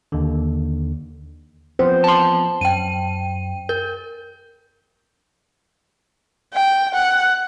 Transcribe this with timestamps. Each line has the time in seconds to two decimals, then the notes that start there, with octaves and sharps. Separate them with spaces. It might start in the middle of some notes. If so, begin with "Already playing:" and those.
0.12 D#2 D3
1.79 F3 B3 C4 C5
2.04 A5 C6
2.61 F#2 G5 D#7
3.69 A#4 G6
6.54 G5
6.95 F#5